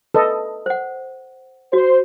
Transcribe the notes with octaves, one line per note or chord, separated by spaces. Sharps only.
A4 B4 D#5
C5 F#5
F#4 C5